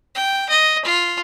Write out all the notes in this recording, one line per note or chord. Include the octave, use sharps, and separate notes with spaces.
G5
D#5
F4